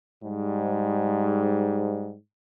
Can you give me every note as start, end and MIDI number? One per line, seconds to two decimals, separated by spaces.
0.23 2.15 44
0.23 2.15 55